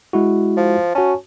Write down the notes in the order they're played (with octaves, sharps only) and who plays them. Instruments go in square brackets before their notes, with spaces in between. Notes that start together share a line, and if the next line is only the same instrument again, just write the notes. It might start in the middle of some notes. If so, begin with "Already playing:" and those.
[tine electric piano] G#3 E4 F#4
[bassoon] F3
[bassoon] C#4 [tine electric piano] F#4 A5